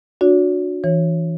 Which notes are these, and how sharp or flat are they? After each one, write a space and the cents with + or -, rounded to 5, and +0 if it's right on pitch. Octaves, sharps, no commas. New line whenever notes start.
D4 +0 F#4 -25 C#5 +40
E3 +5 C#5 -20